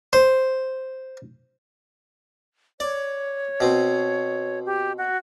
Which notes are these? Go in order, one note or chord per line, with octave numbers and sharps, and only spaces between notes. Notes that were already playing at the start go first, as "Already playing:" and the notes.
C5
C#5 D5
B2 C4
G4
F#4